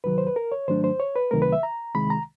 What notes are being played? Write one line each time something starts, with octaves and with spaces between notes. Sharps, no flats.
D2 C3 D#3 F#3 B4
C5
B4
A#4
C#5
G#2 D#3 F#3 A3 D4 C5
C5
C#5
B4
C#2 C3 D#3 F#3 A3 A#4
B4
E5
A#5
C2 C3 D#3 G#3 B5
A#5